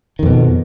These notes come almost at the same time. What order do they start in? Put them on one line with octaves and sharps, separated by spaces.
D#3 F2 B2